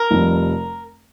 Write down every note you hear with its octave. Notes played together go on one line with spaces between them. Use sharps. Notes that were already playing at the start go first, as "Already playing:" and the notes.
Already playing: A#4
F1 F2 C3 G3